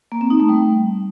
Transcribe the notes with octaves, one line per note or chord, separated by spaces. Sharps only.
A#3
C4
D#4
A3
G3